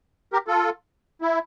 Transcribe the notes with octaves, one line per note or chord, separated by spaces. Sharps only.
G4 A#4
F4 A4
E4